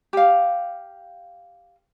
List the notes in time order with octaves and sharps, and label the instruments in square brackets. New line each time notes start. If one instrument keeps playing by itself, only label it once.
[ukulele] G4 F5